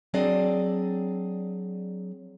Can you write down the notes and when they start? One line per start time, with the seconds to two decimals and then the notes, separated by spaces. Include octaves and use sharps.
0.14 F#3 C4 D4 G#4 D5 D#5